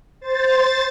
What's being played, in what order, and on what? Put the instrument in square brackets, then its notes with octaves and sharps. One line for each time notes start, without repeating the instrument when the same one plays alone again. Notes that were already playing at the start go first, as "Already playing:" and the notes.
[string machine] C5 A6